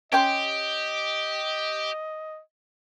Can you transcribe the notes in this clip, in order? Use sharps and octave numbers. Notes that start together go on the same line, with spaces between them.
C#4 G4 D#5 G5 C6